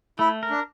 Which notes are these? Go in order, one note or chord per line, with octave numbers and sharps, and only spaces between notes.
A3 E4
A#4
D4